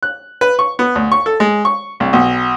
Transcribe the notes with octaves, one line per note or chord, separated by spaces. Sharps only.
F#6
B4
C#6
B3
D2
C#6
A4
G#3
C#6
C2
B1